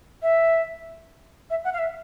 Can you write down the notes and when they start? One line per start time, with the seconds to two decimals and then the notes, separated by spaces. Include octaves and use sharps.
0.22 E5
1.50 E5
1.64 F#5
1.73 F5
1.78 E5